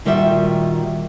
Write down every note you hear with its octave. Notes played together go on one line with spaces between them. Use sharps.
A#2 D#3 G3 F#4 E5